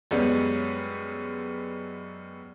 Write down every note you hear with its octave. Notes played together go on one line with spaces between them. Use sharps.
F#2 G3 G#3 B3